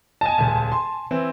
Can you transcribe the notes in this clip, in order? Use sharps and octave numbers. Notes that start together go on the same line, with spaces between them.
D#5 G#5 A5
D#1 C#2
C6
E3 C4 E4